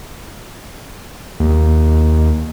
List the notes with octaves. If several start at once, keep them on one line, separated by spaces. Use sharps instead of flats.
D#2